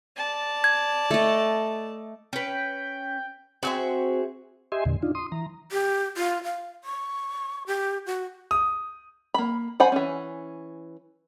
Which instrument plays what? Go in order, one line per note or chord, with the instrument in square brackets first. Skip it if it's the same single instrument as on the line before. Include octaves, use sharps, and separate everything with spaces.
[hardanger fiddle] D5 A5
[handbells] G#6
[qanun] A3 D#5
[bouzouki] C#4 B4 [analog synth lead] G5
[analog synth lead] C4 [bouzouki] F#4 G#4 E5
[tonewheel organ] G4 D#5 E5 G#5 C6
E2 A#2 D3
D4 D#4 F4
C6 D#6
E3 A#5
[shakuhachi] G4
F4
F5
C#6
G4
F#4
[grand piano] D#6
[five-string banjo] A#3 B5
C5 F#5 G#5 B5
E3 C#4